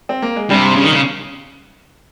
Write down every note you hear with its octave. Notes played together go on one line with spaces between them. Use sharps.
C4
A#3
G#3
G2 C3 G3
C#3
D#3
C#3